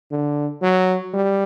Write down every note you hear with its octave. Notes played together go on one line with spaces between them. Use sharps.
D3
F#3
G3